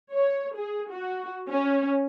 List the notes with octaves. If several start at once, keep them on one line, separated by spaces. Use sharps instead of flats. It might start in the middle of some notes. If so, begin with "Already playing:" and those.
C#5
G#4
F#4
C#4